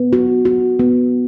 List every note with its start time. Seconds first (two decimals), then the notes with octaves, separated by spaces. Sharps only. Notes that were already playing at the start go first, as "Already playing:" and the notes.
Already playing: B3
0.13 F#4
0.45 F#4
0.79 B3